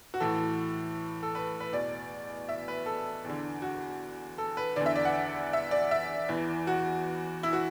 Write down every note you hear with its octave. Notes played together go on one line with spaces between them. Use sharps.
F#4
A2 E3 A4
A4
B4
B4
E2 B2 D5
E5
B4
A4
E2 D3
F#4
A4
B4
E2 D3 D5
E5
D5
F#5
E5
D5
E5
E2 E3
F#4
E4
F#4